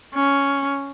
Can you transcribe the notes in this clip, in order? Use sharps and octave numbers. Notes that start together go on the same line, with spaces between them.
C#4